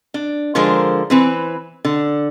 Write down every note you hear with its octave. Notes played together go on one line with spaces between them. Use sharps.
D4
D3 F3 G#3 A#4 C5
E3 C4 B4
D3